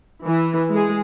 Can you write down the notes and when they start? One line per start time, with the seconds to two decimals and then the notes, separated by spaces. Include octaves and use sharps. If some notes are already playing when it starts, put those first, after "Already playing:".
0.24 E3
0.72 G#3 G#4